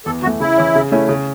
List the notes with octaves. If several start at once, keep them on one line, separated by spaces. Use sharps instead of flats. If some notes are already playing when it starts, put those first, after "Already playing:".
E2 A4
E3 A3 F#4
C#3 E4
E3 C#4
C#3
A3 C#4 E4
C#3